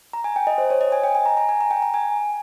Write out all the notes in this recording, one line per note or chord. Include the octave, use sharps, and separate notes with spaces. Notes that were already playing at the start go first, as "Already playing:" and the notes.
A#5
G#5
G5
D#5
C5
C#5
D#5
G#5
G5
G#5
A#5
A#5
G#5
A#5
G5
A#5
G#5